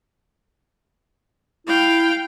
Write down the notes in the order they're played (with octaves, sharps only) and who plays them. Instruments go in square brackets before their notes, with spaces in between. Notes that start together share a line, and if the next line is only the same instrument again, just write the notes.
[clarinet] E4 [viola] F5 G5